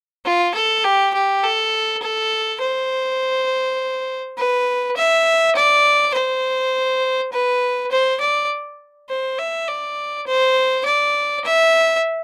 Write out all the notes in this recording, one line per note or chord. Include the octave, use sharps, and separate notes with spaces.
F4
A4
G4
G4
A4
A4
C5
B4
E5
D5
C5
B4
C5
D5
C5
E5
D5
C5
D5
E5